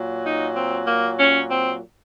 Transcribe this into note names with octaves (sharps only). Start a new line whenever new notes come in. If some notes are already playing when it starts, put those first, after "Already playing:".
Already playing: A#2 F#3
D#4
C4
A#3
C#4
C4